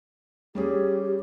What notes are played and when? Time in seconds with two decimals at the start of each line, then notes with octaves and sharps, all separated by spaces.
0.55 G3 C#4 G4 G#4